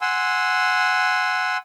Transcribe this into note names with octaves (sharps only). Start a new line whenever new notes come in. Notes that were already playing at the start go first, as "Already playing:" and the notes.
F#5 G#5 C6 E6